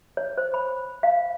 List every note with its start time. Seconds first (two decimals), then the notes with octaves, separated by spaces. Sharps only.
0.17 C#5
0.38 C5
0.54 B5
1.03 F5